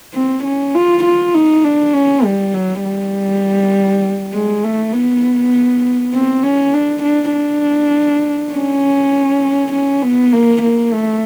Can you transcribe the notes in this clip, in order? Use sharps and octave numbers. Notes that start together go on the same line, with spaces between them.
C4
C#4
F4
F4
D#4
D4
C#4
G3
F#3
G3
G#3
A3
B3
C4
C#4
D4
D4
D4
C#4
C#4
B3
A#3
A#3
A3